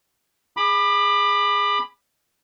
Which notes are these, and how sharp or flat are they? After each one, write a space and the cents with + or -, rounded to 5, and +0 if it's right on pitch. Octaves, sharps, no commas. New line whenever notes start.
G#4 -5 B5 +0 D6 +30